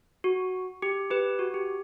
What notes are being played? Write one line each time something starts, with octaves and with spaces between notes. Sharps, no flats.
F#4
G4
G4 B4
F#4
G4